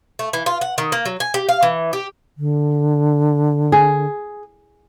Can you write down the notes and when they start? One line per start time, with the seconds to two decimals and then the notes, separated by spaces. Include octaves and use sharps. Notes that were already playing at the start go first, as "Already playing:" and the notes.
0.19 A3
0.33 E3
0.46 F4
0.61 F#5
0.78 D#3
0.92 A#3
1.05 F#3
1.20 G#5
1.34 G4
1.49 F5
1.63 E3
1.93 G4
2.36 D3
3.72 G#4